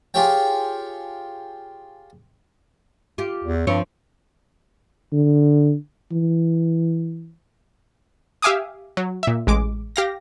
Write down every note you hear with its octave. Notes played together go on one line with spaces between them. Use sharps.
F4 G4 G#4 C#5 G5
F4 G4
E2
G2 F3 C4 C#5
D3
E3
G4 E5 F5 G#5 D6 D#6
F#3
A#2 E5
A1 G#3 D6
G4 F5 A#6